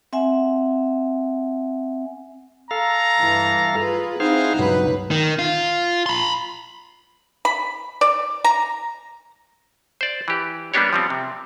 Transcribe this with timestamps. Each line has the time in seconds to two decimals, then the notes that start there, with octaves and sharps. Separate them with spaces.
0.13 C4 E5 F#5 G#5
2.71 A4 F5 A#5
3.18 G2 E3
3.76 F4 G#4 B4
4.20 C4 D#4 E4 G#4 C5 F5 F#5
4.59 C#2 G2 B2 F#3 B4
5.11 D#3
5.39 F4
6.06 B5 C6
7.45 B5
8.01 D5
8.44 A#5
10.01 C5 D5
10.28 E3 G4
10.74 G3 A#3 B3 D4 G4 C#5
10.93 F3 G3 C4
11.10 C3